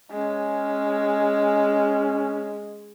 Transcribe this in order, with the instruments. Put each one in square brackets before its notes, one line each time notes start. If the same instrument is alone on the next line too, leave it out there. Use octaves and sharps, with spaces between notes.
[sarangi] G#3 [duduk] C#4